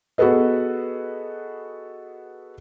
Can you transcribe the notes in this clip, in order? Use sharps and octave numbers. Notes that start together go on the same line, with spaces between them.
B3 F#4 G#4 A4 B4 D#5